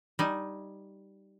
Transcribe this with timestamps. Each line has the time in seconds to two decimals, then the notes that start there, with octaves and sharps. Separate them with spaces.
0.19 G3 D#4 G#5